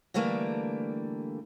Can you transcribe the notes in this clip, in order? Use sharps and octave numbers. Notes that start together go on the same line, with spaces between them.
D3 E3 G3 A3 A#3